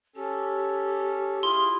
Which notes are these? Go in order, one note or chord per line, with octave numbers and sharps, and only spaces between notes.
C#4 G4 A4
E4 F4 G#4 C6